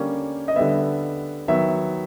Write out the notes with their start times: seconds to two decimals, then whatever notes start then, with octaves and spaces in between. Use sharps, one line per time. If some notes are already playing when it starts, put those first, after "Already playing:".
Already playing: D3 G3 A#3 C#4
0.48 D#5
0.56 D3 G3 B3 E5
1.48 D#3 F#3 B3 E5